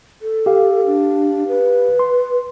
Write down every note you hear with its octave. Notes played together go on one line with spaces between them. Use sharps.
A4
G4 F5
D4
B4
C6